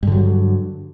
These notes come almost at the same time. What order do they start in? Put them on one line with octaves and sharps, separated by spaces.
G2 D3 F#3